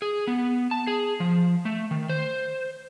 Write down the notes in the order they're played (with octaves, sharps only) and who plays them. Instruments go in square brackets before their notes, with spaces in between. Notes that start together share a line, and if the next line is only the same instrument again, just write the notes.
[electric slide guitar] G#4
B3
A5
G#4
F3
A3
D#3
C5